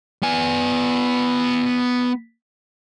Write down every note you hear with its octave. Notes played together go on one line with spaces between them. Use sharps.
B3 G#5